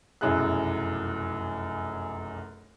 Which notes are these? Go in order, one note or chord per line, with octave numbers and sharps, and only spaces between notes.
F1 B1 F#2 E4 G#4 F#6